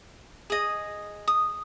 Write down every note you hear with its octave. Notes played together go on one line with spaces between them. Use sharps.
G#4 D#5
D#6